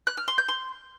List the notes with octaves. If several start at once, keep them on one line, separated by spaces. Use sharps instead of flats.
F#6
F6
C6
G6
C6